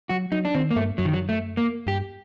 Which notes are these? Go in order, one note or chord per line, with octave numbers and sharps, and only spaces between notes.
F#3 F#4
F#3 D#4
D4
D#3 C4
A#3
G2 A3
F#2 F#3
D#3
F#3
A3
A#3
G2 G4